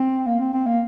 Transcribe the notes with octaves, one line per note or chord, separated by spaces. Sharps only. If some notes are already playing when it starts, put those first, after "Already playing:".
Already playing: C4
A#3
C4
C4
A#3